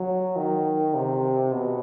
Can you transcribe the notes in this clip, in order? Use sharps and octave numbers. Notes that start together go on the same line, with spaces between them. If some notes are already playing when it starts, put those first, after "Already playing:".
Already playing: F#3
D#3
C3
B2